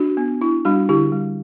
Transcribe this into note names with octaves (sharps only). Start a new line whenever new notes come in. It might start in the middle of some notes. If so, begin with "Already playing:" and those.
Already playing: D4 F#4
B3
D4 E4
G3 D4 F#4
D3 E4 G4
G3